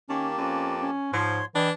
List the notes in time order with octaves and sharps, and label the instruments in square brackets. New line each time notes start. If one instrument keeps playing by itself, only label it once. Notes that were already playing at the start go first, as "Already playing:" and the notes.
[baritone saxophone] D#3 [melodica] A#3 G4 A5 [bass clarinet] C#4
[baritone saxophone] F2 [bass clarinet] C#4
[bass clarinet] C#4
[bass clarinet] G#2 [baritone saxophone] F3 [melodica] C#5 C6
[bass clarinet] E3 [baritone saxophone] D4 [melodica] D#5 G5 B5